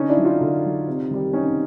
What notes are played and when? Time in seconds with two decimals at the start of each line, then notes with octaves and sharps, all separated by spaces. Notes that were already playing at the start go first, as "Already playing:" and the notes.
Already playing: D3 C#4 D#4
0.09 D4 E4
0.17 F#3
0.25 D#4 F4
0.41 D3
0.64 F#3
0.87 C3
1.10 D#3 G3
1.33 C3 C#4 D#4